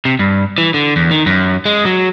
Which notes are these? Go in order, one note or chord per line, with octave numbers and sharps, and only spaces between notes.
C3
G2
E3
D3
E2
D#3
F#2
G#3
F#3